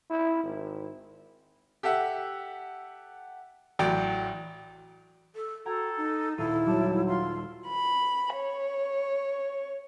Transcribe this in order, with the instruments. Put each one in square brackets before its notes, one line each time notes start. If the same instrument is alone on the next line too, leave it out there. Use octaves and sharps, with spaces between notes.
[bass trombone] E4
G#1
[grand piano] G4 A4 E5 F#5
A1 F#3 D5 G5
[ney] A4
[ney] F#4 [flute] A4 [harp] G5 A#5 G#6
[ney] D#4
[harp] D#1 F4 D#7 [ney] E4 [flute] A4
[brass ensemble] F#3 [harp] G3 [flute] A5
[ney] F4 [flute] C6
[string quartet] B5
C#5